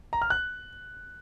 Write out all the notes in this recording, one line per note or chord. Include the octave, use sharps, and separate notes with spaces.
A#5
F6
F#6